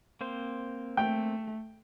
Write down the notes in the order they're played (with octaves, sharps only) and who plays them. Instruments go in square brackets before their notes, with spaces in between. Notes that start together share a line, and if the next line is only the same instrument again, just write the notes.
[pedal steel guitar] A#3 C4 C5
[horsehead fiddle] A3 [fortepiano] G5